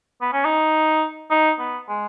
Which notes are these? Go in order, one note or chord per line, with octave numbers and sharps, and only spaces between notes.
B3
C#4
D#4
D#4
B3
G#3